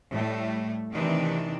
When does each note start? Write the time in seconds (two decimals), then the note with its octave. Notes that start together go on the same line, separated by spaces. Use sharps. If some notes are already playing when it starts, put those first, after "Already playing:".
0.12 A2 G3 A3
0.93 C3 D#3 E3 D4 D#4